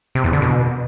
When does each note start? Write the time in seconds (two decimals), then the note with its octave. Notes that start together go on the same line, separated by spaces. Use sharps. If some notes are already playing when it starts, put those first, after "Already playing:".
0.15 C3
0.24 E2
0.33 D3
0.42 B2